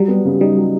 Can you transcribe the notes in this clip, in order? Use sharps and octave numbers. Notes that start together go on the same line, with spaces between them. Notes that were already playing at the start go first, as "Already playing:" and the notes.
Already playing: F#3 G3
B3
C#3
G3 D#4
F#3